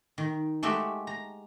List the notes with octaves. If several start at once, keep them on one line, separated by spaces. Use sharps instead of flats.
D#3
G#3 A3 F#4 G4 E5
A#5